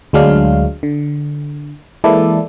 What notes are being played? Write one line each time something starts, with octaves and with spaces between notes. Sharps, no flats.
D2 F#3 G#3 D4 F5
D3
E3 G#3 A#3 E4 A4 D5